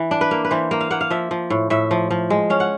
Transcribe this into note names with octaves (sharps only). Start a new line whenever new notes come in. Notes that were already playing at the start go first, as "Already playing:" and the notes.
Already playing: E3
D4
B4
A#3
B4
E3 C5
A#3
F5
A#3 F#5
F5
F3 E5
F3
A2
A2 E5
F3
F3
G#3
C#4 F5
F#5